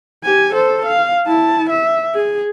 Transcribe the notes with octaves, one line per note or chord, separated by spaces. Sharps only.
G4 G#5
A4 C5
F5
E4 A5
E5
G#4